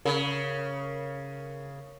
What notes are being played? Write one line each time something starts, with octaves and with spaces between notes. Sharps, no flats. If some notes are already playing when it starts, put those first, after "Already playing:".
C#3 A#4